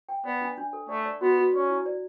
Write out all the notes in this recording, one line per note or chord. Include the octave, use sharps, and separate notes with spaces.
G5
B3 D5
D4
D4
A4
A3 D5
D5
B3 F#4
F#4
C#4 D5
E4
D5